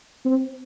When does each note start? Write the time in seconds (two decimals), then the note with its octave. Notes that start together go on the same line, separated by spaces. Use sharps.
0.25 C4